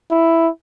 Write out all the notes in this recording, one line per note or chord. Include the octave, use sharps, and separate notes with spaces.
E4